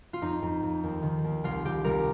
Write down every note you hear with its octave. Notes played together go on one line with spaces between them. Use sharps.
F4
F2 D#4
F2
F2
D#2
D#3
D#2
C2 F4
C2 G4
C2 A#4